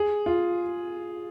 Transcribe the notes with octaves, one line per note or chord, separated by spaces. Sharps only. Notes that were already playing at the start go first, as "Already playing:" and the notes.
Already playing: G#4
F4